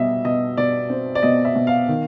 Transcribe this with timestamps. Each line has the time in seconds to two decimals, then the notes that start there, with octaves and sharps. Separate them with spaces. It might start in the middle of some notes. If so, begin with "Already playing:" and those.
Already playing: B2 G3 D#5 E5
0.25 B2 D#5
0.57 B2 D5
0.90 C4
1.15 D5
1.23 B2 D#5
1.45 E5
1.56 B2
1.67 F5
1.88 D#3